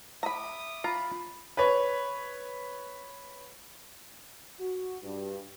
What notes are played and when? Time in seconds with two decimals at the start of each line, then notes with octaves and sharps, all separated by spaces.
0.23 E5 A#5 B5 D6 D#6
0.84 F4 A#5 B5
1.57 B4 C#5
4.59 F#4
5.03 G2